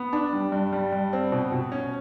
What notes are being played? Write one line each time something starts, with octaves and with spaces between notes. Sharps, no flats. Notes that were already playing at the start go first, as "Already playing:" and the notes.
Already playing: B3
D4
G3
G2
G3
G2
C4
B2
B2
C#4